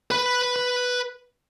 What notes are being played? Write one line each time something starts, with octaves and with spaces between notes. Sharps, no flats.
B4 B5